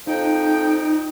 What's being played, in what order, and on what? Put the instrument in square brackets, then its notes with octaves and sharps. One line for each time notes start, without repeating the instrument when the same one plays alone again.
[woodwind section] F2 F3 G5 [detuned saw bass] D#4